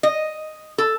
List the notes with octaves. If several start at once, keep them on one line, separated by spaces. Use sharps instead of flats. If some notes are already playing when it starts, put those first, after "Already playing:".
D#5
A4